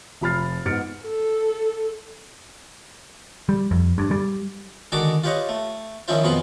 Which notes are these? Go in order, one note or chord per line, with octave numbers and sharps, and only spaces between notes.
F1 F3 B5 F6 A6 C7
G#2 B3 F6 A6 C#7 D7
A4
G3
F2
G2
G3
D3 D#3 G#3 F#4 A5 D6
F4 G4 B4 C#5 D#5
A3
D#3 F3 C#4 E4 F4 C5
F2 B2 F4 G#4 B5